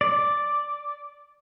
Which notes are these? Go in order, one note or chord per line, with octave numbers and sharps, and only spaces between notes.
D5